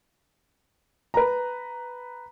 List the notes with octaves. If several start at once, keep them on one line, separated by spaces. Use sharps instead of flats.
B4 A#5